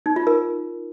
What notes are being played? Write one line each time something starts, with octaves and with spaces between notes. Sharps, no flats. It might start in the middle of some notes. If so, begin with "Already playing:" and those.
D#4
F4
A#4